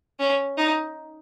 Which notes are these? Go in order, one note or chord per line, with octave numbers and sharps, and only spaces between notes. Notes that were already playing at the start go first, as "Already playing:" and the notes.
C#4
D#4